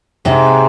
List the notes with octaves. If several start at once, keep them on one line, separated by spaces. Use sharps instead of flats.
G#2 C3